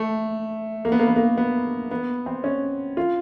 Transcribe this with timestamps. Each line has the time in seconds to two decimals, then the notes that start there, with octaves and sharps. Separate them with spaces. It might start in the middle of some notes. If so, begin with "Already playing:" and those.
Already playing: A3
0.85 A#3
0.92 B3
0.99 A#3
1.07 B3
1.16 A#3
1.37 B3
1.91 B3
2.26 C4
2.44 C#4
2.97 F4